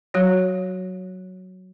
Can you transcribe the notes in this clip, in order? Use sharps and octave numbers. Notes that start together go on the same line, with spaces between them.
F#3 F#4 C#5